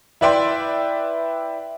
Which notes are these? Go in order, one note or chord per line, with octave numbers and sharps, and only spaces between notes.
E4 B4 D5 E5 G5 C6